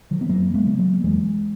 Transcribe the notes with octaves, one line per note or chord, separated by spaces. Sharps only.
D#3 F#3
B3
F#2 F#3 A#3
G#3 B3
C#3
F#3 A#3
E2 E3 G#3